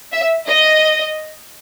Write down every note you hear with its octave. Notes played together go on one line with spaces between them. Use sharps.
E5
D#5